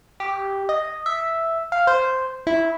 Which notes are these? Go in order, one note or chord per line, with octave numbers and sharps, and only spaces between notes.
G4
D#5
E5
F5
C5
E4